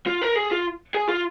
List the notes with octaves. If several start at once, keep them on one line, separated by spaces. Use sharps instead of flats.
F4
A#4
G#4
F4
G#4
F4